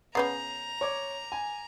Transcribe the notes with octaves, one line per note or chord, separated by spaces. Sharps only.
C#3 B3 C#4 A#5 G6 C7
C#5 D6
G#5